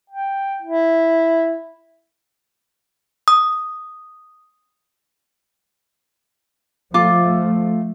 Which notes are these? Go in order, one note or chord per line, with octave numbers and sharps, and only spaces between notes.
G5
E4
D#6
F3 A3 F4 A4 D6